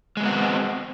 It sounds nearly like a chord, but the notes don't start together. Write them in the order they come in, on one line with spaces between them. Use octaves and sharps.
G#3 F#3 B3 F#4 C4